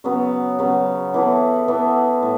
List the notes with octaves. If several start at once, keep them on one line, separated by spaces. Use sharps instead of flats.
C#3 F#3 B3
C#3 F#3 B3
E3 B3 A4
E3 B3 A4
A2